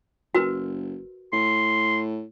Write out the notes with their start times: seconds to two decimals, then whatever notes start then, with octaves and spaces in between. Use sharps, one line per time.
0.35 F#1 F#4 A#4 B4
1.33 A2 C6